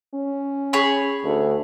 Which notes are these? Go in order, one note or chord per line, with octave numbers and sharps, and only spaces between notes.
C#4
G#4 C#5 B5
D2